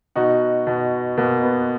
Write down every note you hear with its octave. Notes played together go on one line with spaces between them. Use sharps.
B2 D#4 F#4
B2
B2 A#3
B3